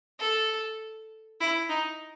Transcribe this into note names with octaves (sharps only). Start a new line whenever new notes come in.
A4
E4
D#4